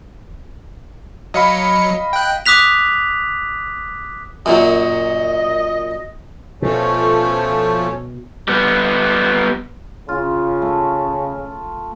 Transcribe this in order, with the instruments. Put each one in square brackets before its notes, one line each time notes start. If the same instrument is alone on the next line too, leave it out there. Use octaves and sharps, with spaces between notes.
[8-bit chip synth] F#3 C#7 [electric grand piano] D#5 F5 B5
[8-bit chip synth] G5 F#6
[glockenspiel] D6 D#6 F#6 B6 F7
[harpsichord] F#2 A#2 F#3 [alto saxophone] D#5
[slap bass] B2 [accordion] F3 A3 [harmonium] C#4 A4 C#5
[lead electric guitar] G3 B3
[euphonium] C#3 [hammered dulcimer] F4
[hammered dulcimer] A3